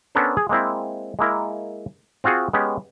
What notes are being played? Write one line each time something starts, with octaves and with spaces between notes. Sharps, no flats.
B3 C#4 D4 A4 A#4 C5
G#4
G#3 A#3 C4 E4
G#3 A#3 E4 A#4
C4 F4 F#4 G#4
G#3 B3 C#4 G4